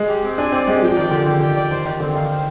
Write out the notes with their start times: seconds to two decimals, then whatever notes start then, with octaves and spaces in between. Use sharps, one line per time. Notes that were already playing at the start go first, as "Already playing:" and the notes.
Already playing: G#3
0.08 G4
0.24 C4
0.38 D4 G#5
0.52 C4 D5
0.67 G#3 G4
0.82 F3 G5
0.97 D#3 D5
1.11 D3 G4
1.26 D3 G4
1.41 D3 G5
1.56 D#3 D5
1.71 D#3 C5
1.85 D#3 G4
2.00 D3 C4
2.15 D#3 F5
2.30 C5